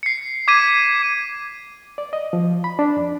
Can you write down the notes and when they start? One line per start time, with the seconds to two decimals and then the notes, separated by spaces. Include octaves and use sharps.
0.03 C7 C#7
0.48 D6 G#6 B6 D#7
1.98 D5
2.13 D#5
2.33 F3
2.64 B5
2.79 D4
2.97 F2